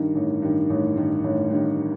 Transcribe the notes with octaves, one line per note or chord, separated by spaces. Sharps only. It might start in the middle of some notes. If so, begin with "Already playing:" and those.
Already playing: G2 D#3
A1
G2 D#3
A1
G2 D#3
A1
G2 D#3